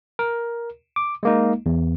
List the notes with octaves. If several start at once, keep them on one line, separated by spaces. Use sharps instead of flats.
A#4
D6
G#3 A#3 D#4
E2